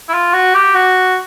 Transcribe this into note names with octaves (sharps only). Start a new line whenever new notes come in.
E4
F4
F#4
G4
F#4